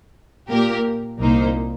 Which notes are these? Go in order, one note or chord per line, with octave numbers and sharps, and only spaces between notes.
A#2 A#3 G4 A#4
C2 A#2 A#3 D#4 C5